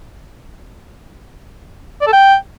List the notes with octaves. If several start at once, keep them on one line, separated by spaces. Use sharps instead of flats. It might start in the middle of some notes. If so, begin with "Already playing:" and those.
D5
A4
G5